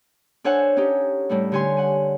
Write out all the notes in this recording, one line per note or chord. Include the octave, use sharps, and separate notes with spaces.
D4 A4 C5 C#5 F#5 G#5
C#4 D#4 G4
A2 G3 A3
D3 G4 C#5 G#5 C6
F#5 G#5